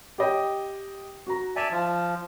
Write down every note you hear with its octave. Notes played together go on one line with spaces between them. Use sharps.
G4 D#5 G5
F#4 A#5
D5 E5 G#5 A5 E7
F3